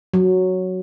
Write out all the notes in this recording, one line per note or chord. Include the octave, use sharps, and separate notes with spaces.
F#3